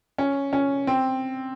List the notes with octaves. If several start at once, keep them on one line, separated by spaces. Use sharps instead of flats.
C#4
C#4
C4